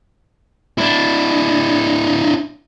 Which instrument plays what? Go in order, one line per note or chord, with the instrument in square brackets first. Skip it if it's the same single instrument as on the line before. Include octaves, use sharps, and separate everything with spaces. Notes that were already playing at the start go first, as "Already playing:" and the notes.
[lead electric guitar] D4 E4